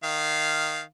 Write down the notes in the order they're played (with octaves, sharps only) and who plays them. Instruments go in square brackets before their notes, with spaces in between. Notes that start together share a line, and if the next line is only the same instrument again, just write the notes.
[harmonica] D#3 F5